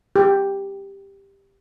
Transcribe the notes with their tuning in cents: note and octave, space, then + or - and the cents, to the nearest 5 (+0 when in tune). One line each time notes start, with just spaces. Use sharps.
G4 +5